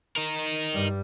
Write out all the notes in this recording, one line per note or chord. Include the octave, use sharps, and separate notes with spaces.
D#4 A#4
G2 G3